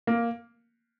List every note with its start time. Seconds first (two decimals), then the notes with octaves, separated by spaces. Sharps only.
0.07 A#3